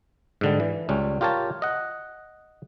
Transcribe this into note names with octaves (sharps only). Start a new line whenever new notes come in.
G#2 D3 G3
E3
C#2 G3 C#4
F4 G4 A#4 C#5 A5
D#5 F#5